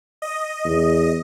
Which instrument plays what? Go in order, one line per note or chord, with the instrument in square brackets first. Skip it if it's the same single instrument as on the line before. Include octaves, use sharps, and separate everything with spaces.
[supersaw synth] D#5
[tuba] E2